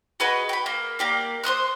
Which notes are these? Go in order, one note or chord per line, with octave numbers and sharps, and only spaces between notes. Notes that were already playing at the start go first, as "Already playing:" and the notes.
F#4 G#4 B4 D#5
G5 B5
A#3
A#3 G4 D5
C5 C6 D#6 F#6